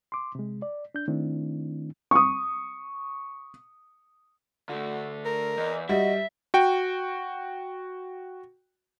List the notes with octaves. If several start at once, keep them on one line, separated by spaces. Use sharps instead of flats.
C6 D6
C3 G#3
D5
D4 G6
D#3 A3 C4 D4 E4
C#6 D#6
D3 A3 F#4
A#4
E2 D#5
G3 F#4 D#5 E5
F#4 G5